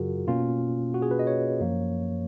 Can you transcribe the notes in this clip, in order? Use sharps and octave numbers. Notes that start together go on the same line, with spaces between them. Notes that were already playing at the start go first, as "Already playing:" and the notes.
Already playing: F#2 C#3 F#3 F4 F#4 G#4 A#4
B2 A#3 C#4 F4
F#4
G#4
B4
D#5
C#5
F#2 F3 A#3